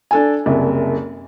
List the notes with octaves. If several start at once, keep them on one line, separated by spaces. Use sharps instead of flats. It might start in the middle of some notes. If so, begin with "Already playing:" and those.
D4 A4 G#5
F#1 C2